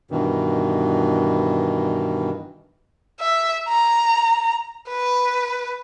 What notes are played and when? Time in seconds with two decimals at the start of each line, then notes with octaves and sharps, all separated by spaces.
0.11 G2 B2 D#3 E3
3.20 E5
3.69 A#5
4.89 B4